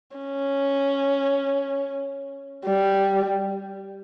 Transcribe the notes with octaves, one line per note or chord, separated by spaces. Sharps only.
C#4
G3